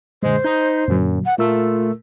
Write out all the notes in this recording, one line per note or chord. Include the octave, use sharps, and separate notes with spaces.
F#2 A#2 D3 G#3 C5
D#4 G6
F#2 A#2 D3 F#3
F#5
A#2 A3 F4 A#4 E6